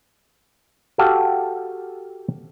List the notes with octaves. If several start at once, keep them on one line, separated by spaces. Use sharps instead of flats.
F#4 G4 A4 F5